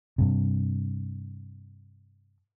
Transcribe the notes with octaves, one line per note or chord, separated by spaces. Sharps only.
G2 C3